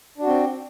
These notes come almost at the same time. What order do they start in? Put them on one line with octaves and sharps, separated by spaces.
D4 F#4 C4